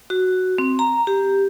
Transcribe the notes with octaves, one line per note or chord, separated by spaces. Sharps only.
F#4
C4
A#5
G4